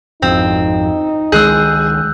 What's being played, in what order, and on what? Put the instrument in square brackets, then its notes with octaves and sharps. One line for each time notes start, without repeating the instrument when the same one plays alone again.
[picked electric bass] G#1 F2 [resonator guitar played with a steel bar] C4 [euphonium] D#4
[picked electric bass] C#2 D#3 G#3 [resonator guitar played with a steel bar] G#4 [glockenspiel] E6 F#6 G6